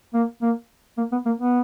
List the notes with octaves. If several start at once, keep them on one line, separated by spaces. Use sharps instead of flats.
A#3
A#3
A#3
B3
A#3
B3